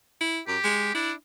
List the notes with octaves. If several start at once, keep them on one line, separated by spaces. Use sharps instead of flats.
E4
F#2 G4
G#3
D4 E4